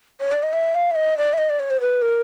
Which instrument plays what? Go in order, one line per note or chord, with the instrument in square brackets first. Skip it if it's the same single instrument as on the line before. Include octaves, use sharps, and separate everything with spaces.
[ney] C#5
D5
D#5
E5
F5
E5
D#5
D5
E5
D#5
D5
C#5
C5
B4
A#4